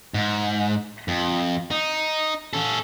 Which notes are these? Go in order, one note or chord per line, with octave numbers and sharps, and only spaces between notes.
G#2
F2
D#4
C#4 A4